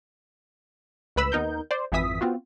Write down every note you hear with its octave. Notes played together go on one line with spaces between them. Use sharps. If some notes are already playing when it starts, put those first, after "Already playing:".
C#2 A2 B4 B5 E6
D#2 B3 D#4 A#4 G6
C5 D5
G#1 F2 E3 E5 D#6 B6
B3 C4 F4 F#4